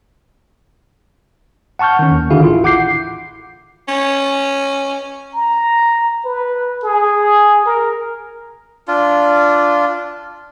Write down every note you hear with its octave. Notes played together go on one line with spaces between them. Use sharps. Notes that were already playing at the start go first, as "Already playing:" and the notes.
F#5 A5 C#6 F6 G6
D#3 C#4
D#2
D3 D#3 E4 F#4 G#4 F5
A1 E4 F4
F#5 D6 G6 C7
C#4
A#5
B4
G#4
A#4
D4 F4